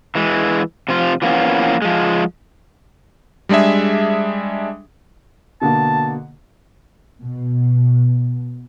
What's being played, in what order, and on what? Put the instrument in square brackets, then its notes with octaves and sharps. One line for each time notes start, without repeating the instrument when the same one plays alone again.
[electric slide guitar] E3 G#3
C3 F3 F4
E3 F3 A#3 B3 C#4
F3 G#3
[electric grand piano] G3 G#3 D4 G#4 E5
[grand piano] B2 D3 A#3 [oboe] A5
[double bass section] B2